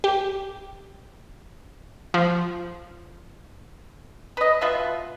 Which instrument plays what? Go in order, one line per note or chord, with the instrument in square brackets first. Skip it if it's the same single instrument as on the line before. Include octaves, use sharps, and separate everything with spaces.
[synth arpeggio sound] G4
F3
[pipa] B4 D#5
B2 F4 B4 E5